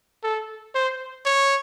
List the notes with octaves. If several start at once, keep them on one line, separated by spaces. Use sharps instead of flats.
A4
C5
C#5